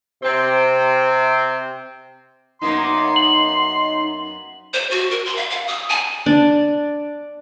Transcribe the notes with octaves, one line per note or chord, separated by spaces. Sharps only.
C3 C4
F#2 A#3 B3 D#4 C6
F#7
C5
F#4
A#4
C6
F5
F5
D#6
G#5
D4